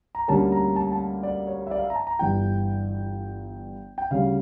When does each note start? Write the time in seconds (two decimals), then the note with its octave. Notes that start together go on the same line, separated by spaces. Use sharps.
0.15 A#5
0.28 D2 D3 G3 A#3 C#4 A5
0.52 A#5
0.76 A5
0.92 A5
1.23 D5
1.47 C#5
1.67 E5
1.71 D5
1.78 F5
1.83 E5
1.90 A#5
1.95 A5
2.07 A#5
2.19 G1 G2 E3 G5
3.98 G5
4.10 D2 C#3 G3 C#4 F5